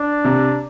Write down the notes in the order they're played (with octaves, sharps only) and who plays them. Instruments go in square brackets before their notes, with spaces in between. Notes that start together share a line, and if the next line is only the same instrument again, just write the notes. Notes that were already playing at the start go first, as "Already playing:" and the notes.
Already playing: [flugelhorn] D4
[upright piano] C3